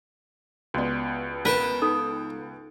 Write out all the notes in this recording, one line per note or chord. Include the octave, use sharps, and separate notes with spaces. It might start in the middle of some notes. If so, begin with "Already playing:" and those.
C#2 B3 F#4 D5
A#4 B4 G5 A5
D#4 A4